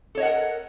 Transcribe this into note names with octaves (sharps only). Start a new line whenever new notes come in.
A4 A#4 C#5 D#5 F#5